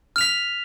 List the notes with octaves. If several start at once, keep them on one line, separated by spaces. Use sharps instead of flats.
F6 B6 F7